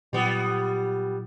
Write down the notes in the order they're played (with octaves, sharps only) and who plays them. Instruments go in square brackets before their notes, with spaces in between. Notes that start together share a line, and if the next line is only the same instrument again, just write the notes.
[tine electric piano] A#2 F#3 F4 [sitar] G3 B3